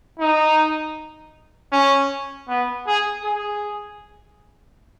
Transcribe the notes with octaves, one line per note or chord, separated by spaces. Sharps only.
D#4
C#4
B3
G#4
G#4